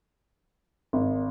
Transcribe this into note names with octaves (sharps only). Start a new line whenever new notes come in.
G#1